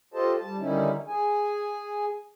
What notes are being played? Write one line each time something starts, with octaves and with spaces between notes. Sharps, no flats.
F4 G4 A4 C5 D#5 A5
G3 A5
D3 D#3 G3 C#4 D#4 E4
G#4 G#5